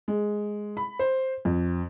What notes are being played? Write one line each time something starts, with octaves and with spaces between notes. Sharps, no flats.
G#3
B5
C5
F2